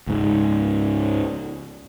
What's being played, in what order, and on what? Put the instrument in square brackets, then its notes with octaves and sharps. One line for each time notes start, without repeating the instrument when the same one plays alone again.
[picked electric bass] C#2 G#2